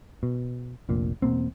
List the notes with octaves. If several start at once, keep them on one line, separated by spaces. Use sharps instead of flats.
B2
F1 A#1 A#2
E1 B2 A#3 C4